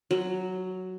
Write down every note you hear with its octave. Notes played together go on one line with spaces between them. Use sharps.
F#3